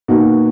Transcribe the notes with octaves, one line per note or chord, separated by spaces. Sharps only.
B2 A#3 D#4 F#4